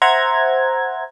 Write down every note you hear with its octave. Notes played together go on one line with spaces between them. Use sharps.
C5 E5 F#5 A#5 G#6